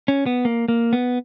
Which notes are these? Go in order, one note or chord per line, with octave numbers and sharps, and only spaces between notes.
C#4
B3
A#3
A#3
B3